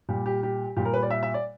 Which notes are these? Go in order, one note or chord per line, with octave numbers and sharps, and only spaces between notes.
A#2 G3 G4
G4
G4
A#2 G3 G4
A#4
B4
D5
E5
E5
D5